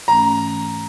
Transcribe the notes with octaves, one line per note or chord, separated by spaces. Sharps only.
G#2 E3 A3 C#4 A#5